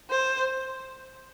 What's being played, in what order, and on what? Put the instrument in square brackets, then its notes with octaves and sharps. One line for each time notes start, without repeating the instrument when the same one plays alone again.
[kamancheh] C5